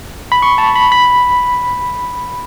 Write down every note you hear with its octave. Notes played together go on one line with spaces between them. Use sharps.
B5
C#6
A5
B5
B5